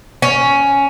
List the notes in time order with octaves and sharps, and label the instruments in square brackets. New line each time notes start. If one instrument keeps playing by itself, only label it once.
[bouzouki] C#4